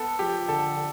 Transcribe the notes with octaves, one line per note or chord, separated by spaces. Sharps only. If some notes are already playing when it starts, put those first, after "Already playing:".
Already playing: B3 A4
F3 G4
D3 A4
D3